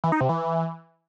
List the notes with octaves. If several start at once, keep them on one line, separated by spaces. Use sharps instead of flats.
E3
D#4
C3
E3